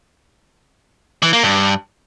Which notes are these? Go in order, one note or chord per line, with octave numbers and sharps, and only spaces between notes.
E3
A#3
G2